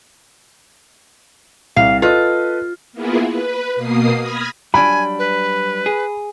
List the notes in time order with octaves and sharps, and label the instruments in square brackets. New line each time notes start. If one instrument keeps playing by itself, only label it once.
[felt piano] C2 [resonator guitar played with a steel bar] F5
[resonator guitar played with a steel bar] F4 [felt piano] A4 B4 D#5
[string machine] A#3 B3 E4 F4 G#4
B4
B2 A#3 D#6 C7
B5 D#6 F6 G#6 A#6
[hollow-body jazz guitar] F#3 G3 D4 [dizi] G#5 [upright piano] B5
[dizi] B4
[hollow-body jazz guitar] G#4